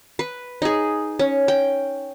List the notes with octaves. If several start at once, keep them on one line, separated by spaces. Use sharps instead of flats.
B4
D#4 G#4
C#4
G5